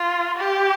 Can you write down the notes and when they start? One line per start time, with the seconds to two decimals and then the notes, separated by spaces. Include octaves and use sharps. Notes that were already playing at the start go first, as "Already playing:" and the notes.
Already playing: F4
0.37 G4